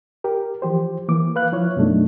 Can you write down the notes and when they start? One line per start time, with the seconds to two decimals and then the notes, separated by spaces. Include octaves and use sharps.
0.24 G4 A#4
0.62 E3 F3 G4 C5
1.08 E3 A#3 D6
1.36 B4 F5 F#6
1.52 F3 E4 C#5
1.77 F#2 B2 F#3 A3 D4 D#4